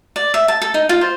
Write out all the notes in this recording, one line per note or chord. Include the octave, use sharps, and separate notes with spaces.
D5
E5
A5
A4
D#4
F4
C5